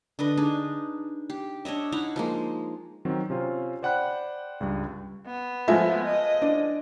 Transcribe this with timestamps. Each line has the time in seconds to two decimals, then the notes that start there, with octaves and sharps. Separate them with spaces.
0.19 D3 D4 B4 D#5
0.37 D4 D#4 G#4
1.30 G4
1.65 D4 C#5 D#5 E5
1.92 D#4 E4 F5 F#5
2.16 F3 G#3 A#3
3.05 D#3 F#3 C4
3.30 C3 C#4 F4 C5
3.83 C5 D5 F#5 G5 B5 F#6
4.60 C#2 G2 G3
5.26 B3
5.68 F3 G#3 A3 E5
6.05 D#5
6.42 D4